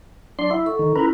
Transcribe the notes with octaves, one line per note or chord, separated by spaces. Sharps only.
F#3 D4 C6
E4 F#5
A4 C#6
D#3
C#4 E4 F4 A#4 B4